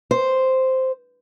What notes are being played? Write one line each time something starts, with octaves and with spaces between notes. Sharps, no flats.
C5